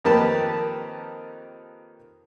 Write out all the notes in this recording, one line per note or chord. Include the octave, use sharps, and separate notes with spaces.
F2 D#3 A#3 G4 B4 A5